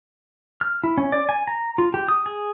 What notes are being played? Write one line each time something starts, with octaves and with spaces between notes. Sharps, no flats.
F6
E4
C#4
D5
G#5
A#5
F4
G4
D#6
G#4